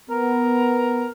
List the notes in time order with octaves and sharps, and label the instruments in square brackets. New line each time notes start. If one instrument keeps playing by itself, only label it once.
[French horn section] B3 [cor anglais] A#4